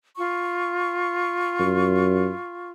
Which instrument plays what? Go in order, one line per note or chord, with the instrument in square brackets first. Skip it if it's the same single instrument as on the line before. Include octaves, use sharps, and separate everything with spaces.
[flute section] F4 C#6
[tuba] F#2